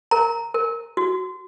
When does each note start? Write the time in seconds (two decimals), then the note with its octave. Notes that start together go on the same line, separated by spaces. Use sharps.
0.11 A#4 A#5
0.54 A#4
0.97 F#4